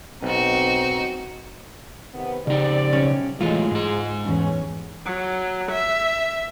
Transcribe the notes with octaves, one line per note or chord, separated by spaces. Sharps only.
B1 C4 D#4 F#4
C3 D#3 B3
C#3 C4 D#4 G4 D5
B1 C#4 C#5
E3 F#3 G#3 A3 F4
G#2 G#4
E2 G2 C#4
F#3
E5